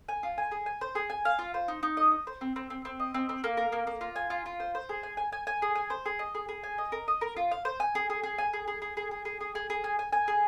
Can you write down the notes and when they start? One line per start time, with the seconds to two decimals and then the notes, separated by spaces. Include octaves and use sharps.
0.09 G#5
0.23 F4
0.38 G#5
0.51 G#4
0.66 G#5
0.81 C5
0.95 G#4
1.10 G#5
1.25 F5
1.39 F4
1.54 C5
1.68 D#4
1.83 D#4
1.97 D#5
2.11 D#5
2.27 C5
2.41 C4
2.56 C4
2.70 C4
2.85 C4
3.00 D#5
3.14 C4
3.29 C4
3.44 A#3
3.57 A#4
3.72 A#3
3.87 A#3
4.01 F4
4.16 G#5
4.30 F4
4.46 F4
4.60 C5
4.75 C5
4.89 G#4
5.03 G#5
5.17 G#5
5.32 G#5
5.47 G#5
5.62 G#4
5.76 G#5
5.90 C5
6.06 G#4
6.19 D#5
6.35 G#4
6.49 G#4
6.64 G#5
6.78 D#5
6.92 A#4
7.08 D#5
7.21 A#4
7.37 F4
7.51 F5
7.65 C5
7.80 G#5
7.95 G#4
8.10 G#4
8.23 G#4
8.38 G#5
8.53 G#4
8.68 G#4
8.82 G#4
8.97 G#4
9.11 G#4
9.25 G#4
9.41 G#4
9.55 G#4
9.70 G#4
9.84 G#5
9.99 G#5
10.13 G#5
10.28 G#4